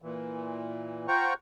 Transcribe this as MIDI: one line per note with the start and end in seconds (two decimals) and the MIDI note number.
0.02 1.07 46
0.02 1.07 52
1.08 1.34 65
1.08 1.34 72
1.08 1.34 78
1.08 1.34 79
1.08 1.34 82
1.08 1.34 85